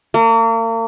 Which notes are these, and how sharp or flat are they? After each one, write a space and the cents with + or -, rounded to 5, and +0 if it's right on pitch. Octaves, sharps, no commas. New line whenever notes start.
A#3 -40